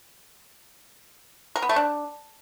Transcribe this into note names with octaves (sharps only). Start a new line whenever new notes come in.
A#4
B3
A3
D4